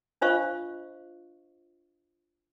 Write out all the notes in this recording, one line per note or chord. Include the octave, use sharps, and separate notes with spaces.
D4 F4 C5 D#5 F5 C#6